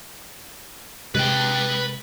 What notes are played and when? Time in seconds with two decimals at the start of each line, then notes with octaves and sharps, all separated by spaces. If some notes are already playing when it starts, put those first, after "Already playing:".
1.15 C3 G#3 B4 G5